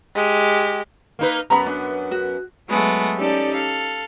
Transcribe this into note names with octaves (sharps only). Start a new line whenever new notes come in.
G#3 G4
A#3 D#4 B4
F#2 B3 A#5 B5
D4
F#4
F#3 G#3 A3 B3
C#4 D#4 G4 A4 D5
A4 F5